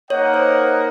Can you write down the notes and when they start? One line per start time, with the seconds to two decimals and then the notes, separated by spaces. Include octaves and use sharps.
0.10 A#3 D#4 A#4 C#5 D#5 F#5
0.34 C5